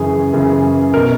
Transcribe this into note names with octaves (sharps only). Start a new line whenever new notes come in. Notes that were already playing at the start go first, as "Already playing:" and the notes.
Already playing: F#2 C#3 E3 G#4
F#2 C#3 E3
B2 A#4